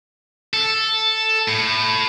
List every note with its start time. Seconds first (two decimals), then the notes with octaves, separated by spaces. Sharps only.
0.53 A4
1.48 A2